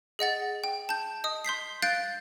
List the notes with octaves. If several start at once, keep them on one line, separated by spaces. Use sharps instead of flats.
G#4 D#5 F#5 A6
G5
A5 G6
D#5 D#6
C6 G6 B6 C7
F5 F#6 G6 A6 C7 D7